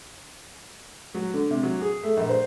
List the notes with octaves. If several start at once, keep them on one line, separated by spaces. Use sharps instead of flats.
F#3
D3
C3
F#3
G#4
A3
A#1
C5